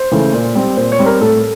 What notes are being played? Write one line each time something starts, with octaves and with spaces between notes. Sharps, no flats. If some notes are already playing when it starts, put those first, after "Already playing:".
Already playing: C5
C#3 E3 A3
A#2
G3 C4
A#2 C5
C#5
G3 C4
A#4
A2 A4